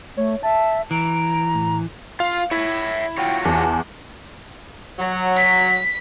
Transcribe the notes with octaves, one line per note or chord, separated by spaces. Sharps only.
A3 C#5
E5 A5
E3 A#5 D7
A2
F4 F5
E4 C#5 E5
F4 F#4 C#5 G5
E2 A5
F#3
B6